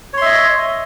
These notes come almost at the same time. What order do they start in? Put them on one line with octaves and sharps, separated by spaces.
C#5 C6 E5 D#5